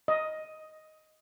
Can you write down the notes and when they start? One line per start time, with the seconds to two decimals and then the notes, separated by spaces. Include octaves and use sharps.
0.08 D#5